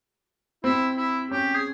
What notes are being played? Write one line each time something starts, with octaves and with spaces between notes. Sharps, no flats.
C4 E4
E4
C#4 G4
G#4